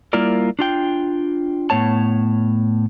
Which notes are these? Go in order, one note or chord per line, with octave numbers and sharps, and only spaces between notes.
G3 A#3 E4 F4 A#4 D5
D4 F4 G5
A2 B3 C#5 A5